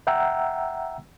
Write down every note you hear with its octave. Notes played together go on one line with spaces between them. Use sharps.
E5 F#5 G5 A#5 E6